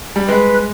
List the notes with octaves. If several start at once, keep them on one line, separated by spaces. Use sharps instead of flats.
G3
G#3 B4